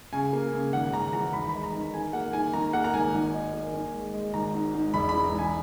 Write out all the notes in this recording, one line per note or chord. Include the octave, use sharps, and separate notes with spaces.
C#3 G#5
A#3
C#3
G#1 F#5
G#1 A#5
E3 A#5
D#2 B5
G#3 B5
A#5
D#3
D#3 G#5
A#3 F#5
D#3 G#5
D#3 A#5
A#3 F#5
A#5
G#1 G#5
D#3
D#4
A#3
D#3
G#3
G#3
G#1 A#5
G#2
G#2
E1 B5
E3 B5
A#5
E3 G#5